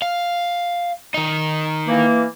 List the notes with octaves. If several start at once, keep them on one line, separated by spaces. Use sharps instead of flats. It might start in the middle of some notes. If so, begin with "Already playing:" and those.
F5
D#3 D#4
E3 A#3